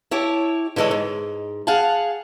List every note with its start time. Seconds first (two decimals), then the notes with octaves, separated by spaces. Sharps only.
0.11 E4 G4 C#5 A5
0.76 D3 E3 G#3 A4 C#5
0.91 G#2
1.67 G#4 F5 F#5 G#5 A5